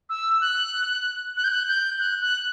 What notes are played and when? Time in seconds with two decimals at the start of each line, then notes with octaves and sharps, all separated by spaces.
0.09 E6
0.41 F#6
1.37 F#6
1.44 G6
1.51 F#6
1.68 G6
2.00 F#6
2.21 F#6